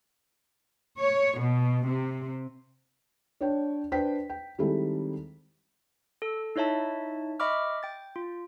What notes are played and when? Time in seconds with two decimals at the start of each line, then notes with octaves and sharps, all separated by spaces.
0.99 C#5
1.40 B2
1.86 C3
3.41 D4 C#5 G5
3.92 D4 B4 C5 G5 B6
4.29 G5
4.58 D#3 G3 G#3 C4 E4 A4
6.22 A4 E6
6.56 D#4 E4 C#5 E5 A5
7.40 D#5 E5 B5 C#6 D6 F6
7.83 G5 A6
8.16 F4